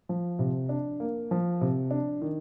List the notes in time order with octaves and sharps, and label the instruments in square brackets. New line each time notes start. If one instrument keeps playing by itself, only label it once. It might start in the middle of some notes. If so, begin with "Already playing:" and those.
[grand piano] F3
C3
D4
A#3
F3
C3
D4
D#3